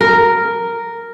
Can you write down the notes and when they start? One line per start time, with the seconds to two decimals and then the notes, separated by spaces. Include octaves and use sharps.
0.01 A#4